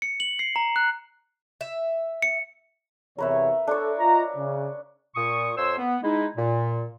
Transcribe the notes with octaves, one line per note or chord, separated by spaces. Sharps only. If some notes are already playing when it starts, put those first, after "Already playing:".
C#7
F#7
C7
A#5
F#6
E5
C#7
E2 C3 A#4 B4 C#5 E5
D4 A4 C#5
F4 D#5 A#5
C#3
A#2 C#6 D#6
F2 C5 C#5 C6 E6
B3
G#3 D#4 E4
A#2